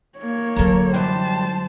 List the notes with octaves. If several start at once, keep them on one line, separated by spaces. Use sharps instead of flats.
A#3 C#5
D3 F#3 A4 A#4
F#2 E3 G3 C5 A5